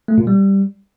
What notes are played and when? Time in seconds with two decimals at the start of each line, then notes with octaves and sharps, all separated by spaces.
0.08 A3
0.18 A#2
0.27 G3